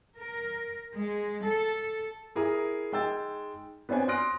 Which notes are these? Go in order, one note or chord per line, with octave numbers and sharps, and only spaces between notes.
A#4
G#3
A4
E4 G#4 A#4 A#5 D#6
G#3 D#4 G5 E6 A6
B3 C4 D4 C5 C#5 G#5
C6 D#6 F6 F#6 A#6 D7